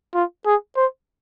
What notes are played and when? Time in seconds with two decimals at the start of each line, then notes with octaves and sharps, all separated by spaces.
0.14 F4
0.46 G#4
0.76 C5